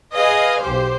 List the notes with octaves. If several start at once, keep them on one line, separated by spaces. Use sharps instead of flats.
G#4 B4 D#5 F5 G#5
B1 G4 C5